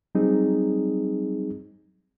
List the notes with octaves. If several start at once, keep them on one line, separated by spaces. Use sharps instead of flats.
F#3 G3 C4 D#4 G#4